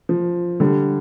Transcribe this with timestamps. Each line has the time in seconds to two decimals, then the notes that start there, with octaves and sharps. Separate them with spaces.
0.09 F3
0.60 D3 G3